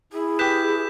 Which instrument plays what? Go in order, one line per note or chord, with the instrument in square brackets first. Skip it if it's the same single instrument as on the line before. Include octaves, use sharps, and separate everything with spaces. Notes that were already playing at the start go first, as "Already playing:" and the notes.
[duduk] E4 [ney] G#4
[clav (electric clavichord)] G4 B4 [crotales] G6 B6 E7